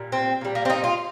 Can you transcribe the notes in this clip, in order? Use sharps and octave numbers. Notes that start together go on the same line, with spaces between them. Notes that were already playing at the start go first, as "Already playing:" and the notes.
Already playing: A#2 G3
C4
A#2 G3
A#3
C4
D#4
F4